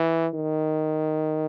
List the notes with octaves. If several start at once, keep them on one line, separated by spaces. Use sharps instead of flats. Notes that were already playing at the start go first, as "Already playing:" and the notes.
Already playing: E3
D#3